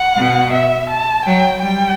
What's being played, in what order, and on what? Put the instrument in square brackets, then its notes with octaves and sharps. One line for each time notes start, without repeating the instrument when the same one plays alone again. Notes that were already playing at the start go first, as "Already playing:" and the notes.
Already playing: [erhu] F#5
[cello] B2
[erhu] E5
A5
[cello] F#3 [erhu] G5
[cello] G3 [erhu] G5